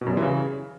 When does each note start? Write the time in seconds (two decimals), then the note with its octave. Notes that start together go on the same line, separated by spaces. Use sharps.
0.01 B2
0.06 F#2
0.12 G3
0.17 E3
0.22 C#3